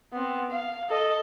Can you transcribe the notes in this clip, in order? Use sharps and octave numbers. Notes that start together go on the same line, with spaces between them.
B3 C4
F5
A4 D#5